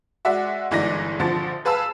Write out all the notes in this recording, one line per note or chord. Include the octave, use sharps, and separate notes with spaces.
G#3 F#4 D5 E5 F#5
G1 E3 G#3 D#4 D5 A#6
A#1 D3 F3 A6
G#4 B4 F5 A5 B5 E6